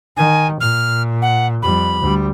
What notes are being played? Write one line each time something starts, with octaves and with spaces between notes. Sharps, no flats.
D#3 G#5
A#2 F6
F#5
F2 G3 B5
D2 G3